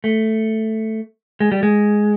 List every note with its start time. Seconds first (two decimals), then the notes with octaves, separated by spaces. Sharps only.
0.04 A3
1.40 G#3
1.52 G3
1.63 G#3